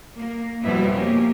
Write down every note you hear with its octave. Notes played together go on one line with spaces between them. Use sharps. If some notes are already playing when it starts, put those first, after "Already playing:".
A#3
F2 B2 G3 B3 E4
A#3 C#4 G4